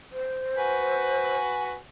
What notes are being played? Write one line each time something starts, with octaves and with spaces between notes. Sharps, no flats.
C5
F#4 B4 G#5